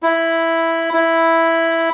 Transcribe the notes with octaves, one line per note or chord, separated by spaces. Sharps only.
E4
E4